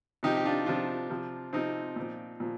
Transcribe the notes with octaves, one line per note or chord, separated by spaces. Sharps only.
C3 F3 D#4 G4
G4
D4 F4
C3 F3 D4 F4
C3 F3
C3 F3 C4 D#4
A#2 F3
A#2 F3